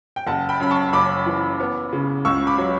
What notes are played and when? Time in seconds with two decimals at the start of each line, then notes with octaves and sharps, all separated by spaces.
0.16 G5
0.27 F#1 F#5 A5
0.49 G5 B5
0.60 F#2 B5
0.71 A5 C#6
0.93 F#1 B5 D6
1.26 E3
1.60 B3
1.93 C#3
2.25 C#2 C#6 E6
2.47 B5 D6
2.58 F#3